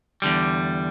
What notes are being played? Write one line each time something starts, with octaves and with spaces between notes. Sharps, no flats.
E2 D3 G3